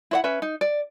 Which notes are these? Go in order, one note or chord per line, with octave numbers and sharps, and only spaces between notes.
E4 C5 F#5
C#4 B4 E5
D#4
D5